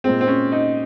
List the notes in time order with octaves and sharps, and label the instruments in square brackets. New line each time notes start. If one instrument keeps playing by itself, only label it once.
[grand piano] A#2 G#3 C4
C4
C#4
D#4